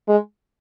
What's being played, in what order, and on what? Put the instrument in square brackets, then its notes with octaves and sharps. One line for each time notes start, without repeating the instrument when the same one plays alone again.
[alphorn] G#3